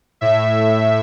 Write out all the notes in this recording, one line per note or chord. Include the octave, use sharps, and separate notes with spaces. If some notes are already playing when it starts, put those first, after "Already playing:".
A2 E5